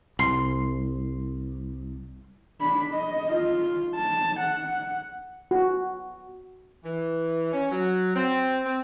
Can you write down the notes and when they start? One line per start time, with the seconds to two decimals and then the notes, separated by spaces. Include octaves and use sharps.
0.19 C2 C6
2.61 D4 B5
2.95 D#5
3.31 F4
3.95 A5
4.40 F#5
5.51 F#4
6.84 E3
7.52 C#4
7.72 F#3
8.15 C4
8.65 C4